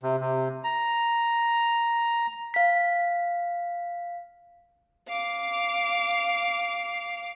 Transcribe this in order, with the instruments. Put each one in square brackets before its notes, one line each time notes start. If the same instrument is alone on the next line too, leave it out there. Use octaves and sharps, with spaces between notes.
[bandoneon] C3
C3
A#5
[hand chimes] F5 B6
[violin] F5 D6